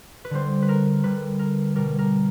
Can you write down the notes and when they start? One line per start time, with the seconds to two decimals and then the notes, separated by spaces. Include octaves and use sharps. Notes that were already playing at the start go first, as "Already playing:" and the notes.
0.25 B4
0.31 D3 G3 C5
0.62 B4
0.69 A#4
1.04 D3 G3 B4
1.39 A#4
1.75 B2 G3 A#4
1.99 A#4